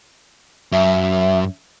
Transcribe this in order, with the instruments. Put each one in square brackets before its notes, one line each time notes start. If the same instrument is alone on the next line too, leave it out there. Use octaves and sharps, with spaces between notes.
[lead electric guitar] F#2 [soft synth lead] E5